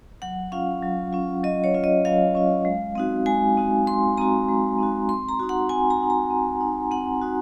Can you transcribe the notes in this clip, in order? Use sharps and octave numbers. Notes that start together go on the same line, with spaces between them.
F#3 F#5
C#4 F4 F5
F#3
C#4 F4
F#3 D#5
C#5
C#4 F4
D#5
F#3 F5
C#4 F4
G#3
C4 D#4 F#4
G#3 G#5
C4 D#4 F#4
G#3 C6
C4 D#4 F#4 A#5
G#3
C4 D#4 F#4
C4 C6
A#5
D#4 F#4
F#5
C4 G#5
A#5
D#4 F#4
A#5
C4
D#4 F#4
C4 F#5
D#4 F#4